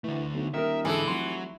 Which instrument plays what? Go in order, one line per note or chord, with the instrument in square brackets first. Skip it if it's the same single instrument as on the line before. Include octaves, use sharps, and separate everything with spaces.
[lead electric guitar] D3 A3 [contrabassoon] E3
[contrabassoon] B1
[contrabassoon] D#1 [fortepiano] D#3 A#4 [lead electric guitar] E5
[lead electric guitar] G#2 D3 [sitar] E3 [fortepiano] G#4 A4
[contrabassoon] F1 [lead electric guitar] F#3 [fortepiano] C6